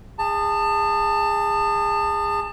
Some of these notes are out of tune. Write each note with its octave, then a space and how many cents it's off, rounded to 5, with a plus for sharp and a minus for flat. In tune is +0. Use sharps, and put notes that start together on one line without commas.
G#4 -25 A5 +20